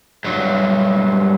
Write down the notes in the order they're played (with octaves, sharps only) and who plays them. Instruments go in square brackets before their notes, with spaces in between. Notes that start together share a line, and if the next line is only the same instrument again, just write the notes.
[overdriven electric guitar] G2 F#3